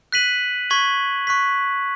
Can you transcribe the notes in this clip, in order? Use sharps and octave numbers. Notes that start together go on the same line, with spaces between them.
F#6 B6 D#7 F#7
C#6 G#6 B6 F#7
C#6 F#6 B6